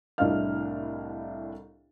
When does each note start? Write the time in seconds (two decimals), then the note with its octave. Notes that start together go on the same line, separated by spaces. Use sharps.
0.18 C2 A2 D4 D#5 F5 F6